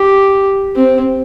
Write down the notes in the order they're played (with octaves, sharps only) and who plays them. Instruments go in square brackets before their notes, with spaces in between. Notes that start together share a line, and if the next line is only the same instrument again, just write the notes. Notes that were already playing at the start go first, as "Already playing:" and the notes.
Already playing: [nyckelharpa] G4
C4